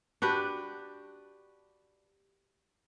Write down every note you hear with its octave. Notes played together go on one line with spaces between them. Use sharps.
D4 F#4 G4 B4